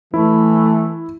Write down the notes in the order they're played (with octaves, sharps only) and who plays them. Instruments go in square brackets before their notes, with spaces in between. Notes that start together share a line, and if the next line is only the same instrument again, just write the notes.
[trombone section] E3 [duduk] A3 [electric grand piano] E4